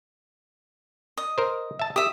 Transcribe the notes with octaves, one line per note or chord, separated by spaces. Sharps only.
D#5
A#4 C5
E5 A5
G4 E5 D#6